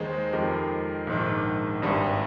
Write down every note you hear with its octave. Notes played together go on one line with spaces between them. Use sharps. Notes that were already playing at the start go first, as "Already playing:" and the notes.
Already playing: D#2 D#3 G#3 G#4 C5
F2 D#3 G#3 G4 A#4
A#1 G#2 D#3
G#1 G2 G3